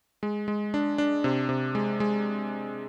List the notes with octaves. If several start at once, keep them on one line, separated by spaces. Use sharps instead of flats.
G#3
G#3
D4
D4
C3
C3
G#3
G#3